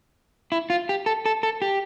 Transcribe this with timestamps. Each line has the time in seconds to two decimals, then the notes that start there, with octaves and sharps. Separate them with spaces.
0.52 E4
0.70 F4
0.89 G4
1.06 A4
1.26 A4
1.43 A4
1.62 G4